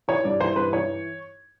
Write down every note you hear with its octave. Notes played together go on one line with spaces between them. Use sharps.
E3 C#5
G2 D5
E3 C5
G2 B4
E3 C#5